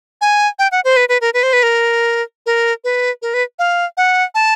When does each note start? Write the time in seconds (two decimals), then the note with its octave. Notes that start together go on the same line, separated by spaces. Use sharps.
0.21 G#5
0.59 G5
0.72 F#5
0.85 C5
0.97 B4
1.09 B4
1.21 A#4
1.34 B4
1.43 C5
1.53 B4
1.63 A#4
2.46 A#4
2.84 B4
3.22 A#4
3.34 B4
3.59 F5
3.97 F#5
4.35 A5